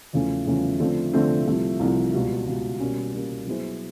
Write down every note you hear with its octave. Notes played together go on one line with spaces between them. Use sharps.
E2 C#3 F3 A3 C#4
E2 C#3 F3 A3 C#4
D3 F3 A3 C4
D3 F3 A3 C4
C2 C3 F3 A3
C2 C3 F3 A3
C#2 B2 G3
C#2 B2 G3
B2 G3 A#3 C#4
B2 G3 A#3 C#4
F#3 B3 E4 G#4 C5